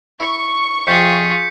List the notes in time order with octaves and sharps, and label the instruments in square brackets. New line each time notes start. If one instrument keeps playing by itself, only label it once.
[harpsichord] E4 [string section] C#6
[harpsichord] F2 C3 [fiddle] F4 G#4 [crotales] G6 B6 C#7